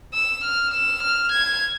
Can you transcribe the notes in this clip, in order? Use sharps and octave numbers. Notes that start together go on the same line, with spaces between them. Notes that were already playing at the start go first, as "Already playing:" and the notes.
E6
F6
E6
F6
G#6